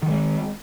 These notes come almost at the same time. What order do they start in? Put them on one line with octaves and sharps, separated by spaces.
D#3 F#3 G#3